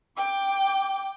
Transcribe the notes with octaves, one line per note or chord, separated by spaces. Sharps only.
G5 D6